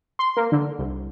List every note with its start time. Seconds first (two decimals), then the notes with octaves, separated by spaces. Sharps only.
0.19 C6
0.37 A#3
0.52 D3
0.79 C2